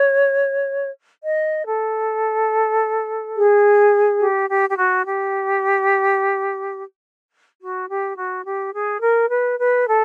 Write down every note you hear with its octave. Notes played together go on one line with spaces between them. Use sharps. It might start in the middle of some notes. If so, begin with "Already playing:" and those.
Already playing: C#5
D#5
A4
G#4
G4
G4
G4
F#4
G4
F#4
G4
F#4
G4
G#4
A#4
B4
B4
A4